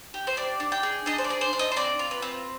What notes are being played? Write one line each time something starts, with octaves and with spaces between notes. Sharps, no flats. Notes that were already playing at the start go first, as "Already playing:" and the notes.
G4
C5
D4 D5
D4
G5
G#4
D4 D#5
C5
D5
G#4
C5
D4
D#5
C5
C4 D5
F4
B4
C4